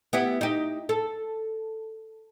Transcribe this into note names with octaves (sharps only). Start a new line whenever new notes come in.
B3 E4 G4
D#4 G4
A4